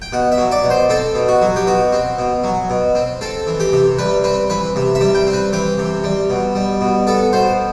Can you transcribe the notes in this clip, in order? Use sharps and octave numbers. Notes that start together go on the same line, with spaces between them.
G5
B2 F#5
E5
F#3
D5
B2
C5
C4 A4
B2
F#4
F#3
G4
B2 F#4
C4
B2
F#3
B2
C4
C4 A4
E3
G4
C3
G3 B4
C4 B4
E3 B4
C3
E5
G3
G5
C4
B4
E3 G4
C3
G3
B2
G3
B2
B3 A4
B2 C5